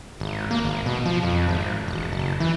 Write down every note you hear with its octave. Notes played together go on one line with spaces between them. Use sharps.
G#1
A#3
G#1
B2
F3
F2
G#1
E1
F#1
E3